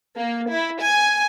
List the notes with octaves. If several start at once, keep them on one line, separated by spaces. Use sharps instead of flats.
A#3
E4
G#5